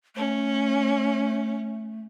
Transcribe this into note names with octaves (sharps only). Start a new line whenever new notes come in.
A3 C#4